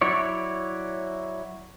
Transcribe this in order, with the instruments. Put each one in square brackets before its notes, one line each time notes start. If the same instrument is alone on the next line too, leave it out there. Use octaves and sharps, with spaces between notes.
[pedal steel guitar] F#3 E4 C#5 D5